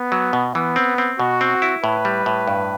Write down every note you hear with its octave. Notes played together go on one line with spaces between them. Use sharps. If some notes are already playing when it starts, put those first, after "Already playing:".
Already playing: B3
F#3
B2
E3 B3
C4
C4
B2 F#4
C4
E4
A2 B4
G3
A2
G2